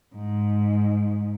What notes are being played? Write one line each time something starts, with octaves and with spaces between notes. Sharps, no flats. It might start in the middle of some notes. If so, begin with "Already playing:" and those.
G#2